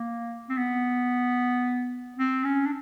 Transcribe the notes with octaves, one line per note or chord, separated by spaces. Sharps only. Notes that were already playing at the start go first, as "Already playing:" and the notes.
Already playing: A#3
C4
B3
C4
C#4
D4